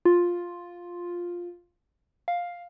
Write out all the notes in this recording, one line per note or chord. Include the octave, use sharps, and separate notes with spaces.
F4
F5